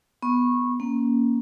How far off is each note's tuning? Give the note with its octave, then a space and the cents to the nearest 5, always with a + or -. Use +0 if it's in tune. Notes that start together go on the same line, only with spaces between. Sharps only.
B3 +0 C#6 -20
A#3 +10 C#4 +0